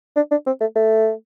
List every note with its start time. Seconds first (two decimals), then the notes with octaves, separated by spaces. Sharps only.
0.16 D4
0.31 D4
0.46 C4
0.61 A3
0.76 A3